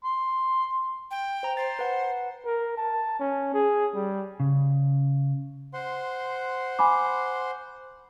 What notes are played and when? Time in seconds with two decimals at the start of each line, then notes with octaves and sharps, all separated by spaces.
0.04 C6
1.11 G5
1.43 C5 A#5
1.57 C5 A6
1.79 B4 F#5
2.46 A#4
2.77 A5
3.19 C#4
3.54 G#4
3.94 G3
4.40 C#3
5.74 C5 F#5 C6
6.79 G#5 B5 D6